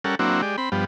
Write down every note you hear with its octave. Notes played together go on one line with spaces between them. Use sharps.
G3 C#4 A4 A#4 F#5
F#3 A#3 C4 D4 E4 F#4
G#3 G4 D5
C4 B5
G2 F3 G3 B3